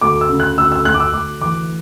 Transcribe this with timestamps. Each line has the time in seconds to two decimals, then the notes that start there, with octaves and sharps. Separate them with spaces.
0.01 D2 D6
0.21 E6
0.30 C#3
0.40 F#6
0.58 D2 E6
0.72 E6
0.85 D2 F#6
0.94 D6
1.00 E6
1.13 D2 D6
1.41 E3 D6